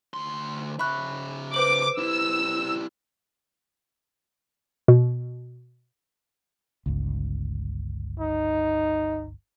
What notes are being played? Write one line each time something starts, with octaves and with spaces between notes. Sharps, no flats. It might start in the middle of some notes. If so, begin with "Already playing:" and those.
D2 C6
C#3 E5 B5 C#6 F#6
B4 C5 D6 F#7
G3 E4 E6
B2
G1 C#2
D#4